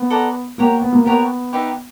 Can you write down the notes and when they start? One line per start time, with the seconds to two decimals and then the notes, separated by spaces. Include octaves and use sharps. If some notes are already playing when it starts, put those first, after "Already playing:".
Already playing: B3
0.10 A4 D5 F#5 A#5
0.58 A#3 G4 A#4 C#5 F#5
0.82 B3
0.93 A#3
1.04 B3 G4 A#4 C#5 F#5
1.53 D#4 G4 B4 E5